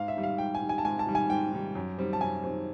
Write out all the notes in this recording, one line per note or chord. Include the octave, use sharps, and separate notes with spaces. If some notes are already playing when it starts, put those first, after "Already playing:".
Already playing: G#2 F5
E5
D#3 G3
F5
G#2 G5
G#5
D#3 G3
G#5
A5
G#2 G#5
A5
D#3 G3
G#5
G#2 G5
D#3 G3
F#2
D#3 G3 C4
A5
F#2 G#5
D#3 G3 C4